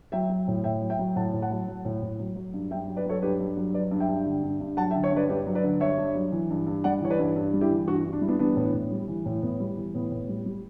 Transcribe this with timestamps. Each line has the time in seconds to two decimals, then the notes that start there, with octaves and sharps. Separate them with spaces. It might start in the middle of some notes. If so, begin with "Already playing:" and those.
0.12 F#3 E5 G5
0.29 F#3
0.48 A2
0.64 A2 E5 G5
0.82 F#3
0.90 E5 G5
0.99 F#3
1.16 A2 F#5 A5
1.33 A2
1.42 F#5 A5
1.51 F#3
1.68 F#3
1.85 A2
2.02 A2
2.20 F#3
2.36 F#3
2.54 G2
2.71 G2 E5 G5
2.88 F#3
2.96 B4 D5
3.06 F#3 A4 C#5
3.22 G2 G4 B4
3.40 G2
3.57 F#3
3.74 F#3 B4 D5
3.91 G2
4.00 E5 G5
4.09 G2
4.25 D3
4.43 G2
4.61 G2
4.77 F#3 F#5 A5
4.91 E5 G5
4.95 D3
5.04 C#5 E5
5.12 G2 B4 D5
5.29 G2 G4 B4
5.47 F#3
5.55 B4 D5
5.64 D3
5.80 G2 C#5 E5
5.98 G2
6.15 F#3
6.32 E3
6.50 G2
6.67 G2
6.84 G3 D5 F#5
7.01 E3 C#5
7.10 B4 D5
7.19 G2
7.36 G2
7.53 G3
7.61 E4 G4
7.71 E3
7.88 G2 D4 F#4
8.04 G2
8.13 D4
8.21 G3 E4
8.28 B3 D4
8.39 E3 B3 D4
8.56 A2
8.74 A2
8.92 G3
9.08 E3
9.26 A2
9.42 A2 B3
9.60 G3
9.77 E3
9.94 A2 B3
10.11 A2
10.29 G3
10.46 G3